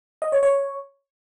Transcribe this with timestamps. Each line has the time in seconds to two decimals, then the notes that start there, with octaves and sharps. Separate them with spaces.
0.22 D#5
0.32 C#5
0.43 C#5